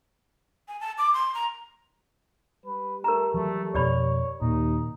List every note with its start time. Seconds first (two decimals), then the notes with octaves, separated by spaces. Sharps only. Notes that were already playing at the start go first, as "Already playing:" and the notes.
0.68 G#5
0.81 A5
0.98 D6
1.14 C6
1.35 A#5
2.66 G3 B4
3.04 A3 A#4 A#5
3.34 E3 F#3 A3
3.75 F2 B2 G4 C#5 D5 B5
4.42 D#2 A#2 D#4